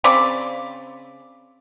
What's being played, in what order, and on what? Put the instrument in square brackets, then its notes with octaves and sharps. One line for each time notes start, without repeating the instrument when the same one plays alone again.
[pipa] C#3 C4 D5 B5